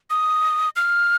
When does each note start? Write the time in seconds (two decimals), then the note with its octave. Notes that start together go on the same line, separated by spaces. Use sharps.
0.10 D#6
0.76 F6